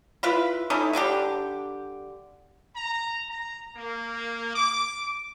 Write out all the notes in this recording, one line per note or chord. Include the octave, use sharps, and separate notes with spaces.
E4 F4 B4
A3 C#4 D#4 E4
D3 G3 D4 G4
A#5
A#5
A#3
D6